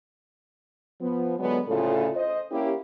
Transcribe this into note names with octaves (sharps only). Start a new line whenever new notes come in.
F3 B3
D3 F#3 G#3 B3
D2 A2 C#3 F4 A4
C5 D#5
A#3 C#4 E4 G4